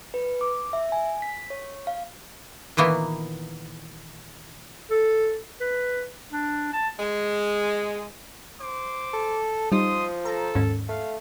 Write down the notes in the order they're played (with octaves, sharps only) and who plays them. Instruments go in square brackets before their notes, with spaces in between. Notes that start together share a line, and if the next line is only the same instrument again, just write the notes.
[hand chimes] B4
D6
E5
G#5
B6
C#5
F5
[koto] A#2 D#3 E3 A#3 B3
[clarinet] A4
B4
D4
A5
[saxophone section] G#3
[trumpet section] C5 D6
[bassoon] A4
[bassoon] F3 [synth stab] G3 D#4 [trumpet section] C6 D#6
[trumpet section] A4 [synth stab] A#5
[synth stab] D#2 G#2 C#4
[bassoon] A3 [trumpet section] F5